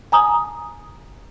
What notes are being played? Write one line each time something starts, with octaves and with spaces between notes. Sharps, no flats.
G#5 A#5 D#6